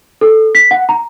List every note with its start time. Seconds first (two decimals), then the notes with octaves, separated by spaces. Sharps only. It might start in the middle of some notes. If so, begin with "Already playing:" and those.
0.21 A4
0.55 B6
0.71 F#5
0.89 A#5